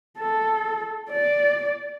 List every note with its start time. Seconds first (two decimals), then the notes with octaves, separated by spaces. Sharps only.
0.19 A4
1.11 D5